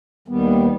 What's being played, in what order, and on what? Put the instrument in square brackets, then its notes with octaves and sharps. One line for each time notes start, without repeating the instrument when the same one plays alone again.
[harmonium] D#2 D#3 G3 B3